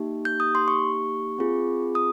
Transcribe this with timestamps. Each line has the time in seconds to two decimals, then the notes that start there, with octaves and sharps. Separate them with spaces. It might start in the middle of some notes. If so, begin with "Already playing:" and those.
Already playing: A#3 D#4 G4
0.25 G6
0.40 D#6
0.55 C6
0.68 C#6
1.38 C4 F4 G#4
1.95 D#6